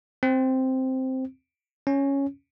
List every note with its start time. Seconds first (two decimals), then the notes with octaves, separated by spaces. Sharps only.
0.23 C4
1.87 C#4